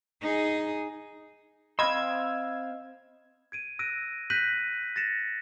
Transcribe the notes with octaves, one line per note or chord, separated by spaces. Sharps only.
D#4 G#4
C4 D#5 F5 B5 C6 E6 G#6
G#6 D7 D#7
E6 F#6 A#6 D7 D#7
F#6 G6 A#6 B6 D#7 F#7
A6 A#6 C#7 E7